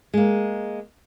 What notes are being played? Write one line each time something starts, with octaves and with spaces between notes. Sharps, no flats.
G#3 A#3